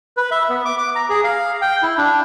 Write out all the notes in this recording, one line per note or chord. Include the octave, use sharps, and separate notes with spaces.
B4
E5
B3
D6
D6
A#5
G#4
F5
G5
E4
D4